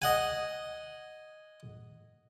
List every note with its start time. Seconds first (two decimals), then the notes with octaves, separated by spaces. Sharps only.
0.02 D#5 F#5 G#5